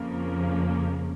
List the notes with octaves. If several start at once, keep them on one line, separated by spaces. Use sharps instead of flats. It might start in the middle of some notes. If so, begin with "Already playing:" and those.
Already playing: F2 C#3 F3 A#3